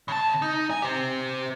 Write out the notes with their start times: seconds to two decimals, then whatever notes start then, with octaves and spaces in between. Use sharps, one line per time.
0.08 C#3 A5
0.42 D#4
0.70 G#5
0.82 G4 C5